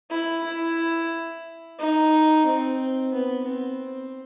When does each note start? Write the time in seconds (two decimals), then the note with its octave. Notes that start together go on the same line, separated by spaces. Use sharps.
0.10 E4
0.44 E4
1.79 D#4
2.46 C4
3.13 B3
3.47 C4